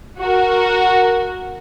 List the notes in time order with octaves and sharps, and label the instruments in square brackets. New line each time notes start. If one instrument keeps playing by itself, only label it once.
[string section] F#4 A#4